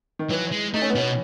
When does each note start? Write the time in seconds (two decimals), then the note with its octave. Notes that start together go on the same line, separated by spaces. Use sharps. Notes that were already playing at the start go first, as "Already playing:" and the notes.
0.19 D#3
0.30 E3 F#3
0.52 G#3
0.74 A3 D#4
0.82 C#4
0.90 B3
0.95 B2 C#4